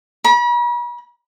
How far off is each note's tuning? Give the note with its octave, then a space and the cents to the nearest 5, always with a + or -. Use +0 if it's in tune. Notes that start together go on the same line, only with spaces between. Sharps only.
B5 -45